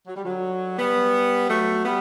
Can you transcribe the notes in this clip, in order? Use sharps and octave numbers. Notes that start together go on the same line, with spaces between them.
F#3
G3
D3 F#3
G3 B3
F#3 A3
G3 B3